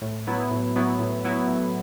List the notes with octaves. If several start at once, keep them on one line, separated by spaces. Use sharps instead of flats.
A2
F#3 B3 E4
A2
F#3 B3 E4
A2
F#3 B3 E4
A2